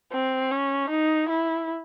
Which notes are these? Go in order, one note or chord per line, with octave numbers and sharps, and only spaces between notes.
C4
C#4
D#4
E4